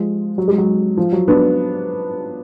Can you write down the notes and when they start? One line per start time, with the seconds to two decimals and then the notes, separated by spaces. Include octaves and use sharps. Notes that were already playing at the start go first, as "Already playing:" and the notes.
Already playing: F3 G#3
0.38 F#3
0.48 G#3
0.58 F#3
0.97 F3
1.12 F#3
1.28 B3 D4